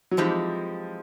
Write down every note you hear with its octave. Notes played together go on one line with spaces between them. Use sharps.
F#3
E3 F3 G#3 C4 D#4 G4